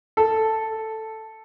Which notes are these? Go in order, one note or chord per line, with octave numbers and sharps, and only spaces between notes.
A4